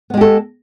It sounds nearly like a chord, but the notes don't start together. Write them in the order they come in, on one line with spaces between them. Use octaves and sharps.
B3 G#3 G4 A4